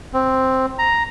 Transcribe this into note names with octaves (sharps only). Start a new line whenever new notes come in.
C4
A#5